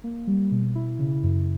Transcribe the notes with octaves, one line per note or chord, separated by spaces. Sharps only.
A#3
G3
B2
E4
C#3
F#2